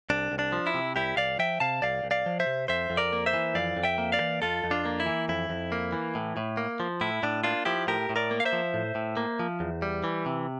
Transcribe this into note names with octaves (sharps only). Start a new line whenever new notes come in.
C2 D4
C2
D4
F3
E4
C3
C2 E4 G4
C2 D5 F5
F3 E5 G5
C3 F5 A5
C2 D5 F5
C2
D5 F5
F3
C5 E5
C3
F2 C5 E5
F2
A#4 D5
A#3
C5 E5
E3
F2 D5 F5
F2
E5 G5
A#3
D5 F5
E3
F2 F4 A4
F2
D4 F4
A#3
E4
E3
F2 E4
F2
A#3
E3
A2
A2
A#3
F3
A2 E4
A2 D4
A#3 D4 F4
F3 E4 G4
A2 G4 A#4
A2
A#4 D5
A#3
F5
C5 E5
F3
A2
A2
A#3
F3
E2
G3
E3
C3